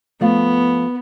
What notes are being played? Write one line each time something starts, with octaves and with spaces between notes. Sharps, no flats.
F3 A3 B3 F5